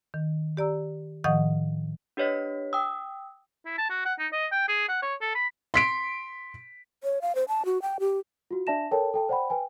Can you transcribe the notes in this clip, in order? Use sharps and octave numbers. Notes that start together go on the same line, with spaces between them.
D#3
G4 D5 A#5 E6
A2 D#3 F3 D#5 F#5 D#6
D4 G4 B4 C#5 D#5 B6
G5 D#6 E6
E4
A5
F#4
F#5
D#4
D#5
G5
G#4
F#5
C#5
A4
B5
C6 B6 D7
C#5
F5
C5
A5
F#4
G5
G4
F4 F#4
D4 D5 E5 A5 A#6 E7
A4 A#4 C#5 G5 A5
A4 G5 A5
C5 D5 F#5 G5 B5
B4 G5 G#5